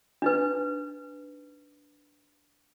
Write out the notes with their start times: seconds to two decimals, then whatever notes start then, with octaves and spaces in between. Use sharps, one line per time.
0.22 D4 D#4 B4